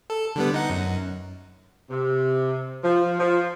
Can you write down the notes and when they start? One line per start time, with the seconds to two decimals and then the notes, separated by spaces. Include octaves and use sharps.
0.10 A4
0.36 D3 G3 B3
0.54 D#4 F#5
0.70 F#2
1.90 C3
2.83 F3
3.19 F3